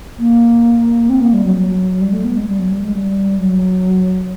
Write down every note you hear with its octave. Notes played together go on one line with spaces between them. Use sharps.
A#3
C4
A#3
G3
F#3
F#3
G3
A3
B3
G#3
G3
F#3
G3
G#3
G3
F#3